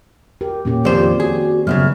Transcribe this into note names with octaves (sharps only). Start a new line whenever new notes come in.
G4 A#4
A#2 A#3 C#4 G4
F2 D#3 C4 G4 C5 D5
F#4 G#4
F#2 A2 C#3 F#3 G3 B3 F6